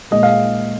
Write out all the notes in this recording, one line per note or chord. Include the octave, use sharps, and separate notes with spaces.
A#2 G#3 D#5
F5